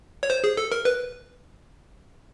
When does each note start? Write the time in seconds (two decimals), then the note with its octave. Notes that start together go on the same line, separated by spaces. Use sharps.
0.23 C#5
0.30 C5
0.44 G#4
0.57 A4
0.72 A#4
0.85 B4